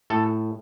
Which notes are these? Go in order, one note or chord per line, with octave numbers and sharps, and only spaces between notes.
A2 A4